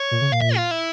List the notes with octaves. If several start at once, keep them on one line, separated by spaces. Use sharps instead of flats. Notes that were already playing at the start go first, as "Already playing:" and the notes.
Already playing: C#5
A#2
C#3
A#2 F5
E5
F4
E4